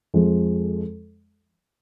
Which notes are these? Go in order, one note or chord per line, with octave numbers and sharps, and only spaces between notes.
F2 F3 G#3